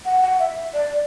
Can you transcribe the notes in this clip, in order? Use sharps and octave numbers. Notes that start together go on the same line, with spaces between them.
F#5
F#5
E5
D5